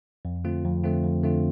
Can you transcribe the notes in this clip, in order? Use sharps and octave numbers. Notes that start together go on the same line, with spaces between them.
F2
D3 A3 C4 F4
F2
D3 A3 C4 F4
F2
D3 A3 C4 F4